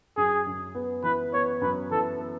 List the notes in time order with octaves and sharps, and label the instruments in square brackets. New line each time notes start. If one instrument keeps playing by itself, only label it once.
[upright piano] F#2 [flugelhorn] G#4
[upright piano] F#2
B3
[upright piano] E3 [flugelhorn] B4
[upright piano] B3 [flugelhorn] C#5
[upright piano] F#2 [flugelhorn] B4
[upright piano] E3 [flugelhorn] A4
[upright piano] B3